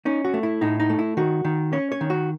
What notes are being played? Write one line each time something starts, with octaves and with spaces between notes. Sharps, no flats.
C#4 D#4
F#4
A3
E4
A2 D#4
D#4
A3
E4
D#3 F#4
D#3
C#4 C#5
C#5
D#3
F#4